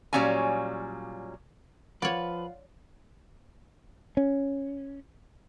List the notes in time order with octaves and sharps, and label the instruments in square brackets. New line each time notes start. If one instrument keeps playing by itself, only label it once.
[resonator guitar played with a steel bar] A#2 F#3 G3 C#4 F5 G#5
[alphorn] F3 [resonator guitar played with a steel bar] F4 F5 F#5 [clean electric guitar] B4 [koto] C#5 D5
[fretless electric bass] C#4